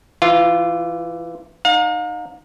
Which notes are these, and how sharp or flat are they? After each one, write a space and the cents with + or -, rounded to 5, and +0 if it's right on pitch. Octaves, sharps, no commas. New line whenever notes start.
E3 +15 F4 -10
D#4 -10 F5 +40